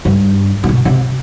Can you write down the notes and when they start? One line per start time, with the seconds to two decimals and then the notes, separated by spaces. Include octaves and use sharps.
0.05 G2
0.64 A#2
0.69 B2
0.85 C3